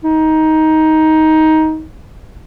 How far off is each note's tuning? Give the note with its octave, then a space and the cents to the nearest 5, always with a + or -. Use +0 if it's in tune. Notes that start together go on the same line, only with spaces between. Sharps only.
D#4 +15